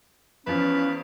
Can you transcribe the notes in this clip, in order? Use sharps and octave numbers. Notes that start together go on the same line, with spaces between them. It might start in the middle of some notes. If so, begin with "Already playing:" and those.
E2 F3 C#4 B4